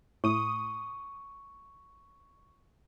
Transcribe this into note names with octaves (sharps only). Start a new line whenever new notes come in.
A2 C#6 D#6